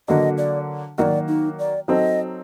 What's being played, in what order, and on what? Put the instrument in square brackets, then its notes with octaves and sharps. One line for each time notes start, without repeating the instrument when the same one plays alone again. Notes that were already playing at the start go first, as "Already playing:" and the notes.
[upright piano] D3 F#3 A#3 D4 F#4 [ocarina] D#5
[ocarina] D5
[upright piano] D#3 F#3 A#3 F#4 [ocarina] D5 D#5
[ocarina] D#4
D5
[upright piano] F#3 C4 D#4 A4 [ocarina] D#5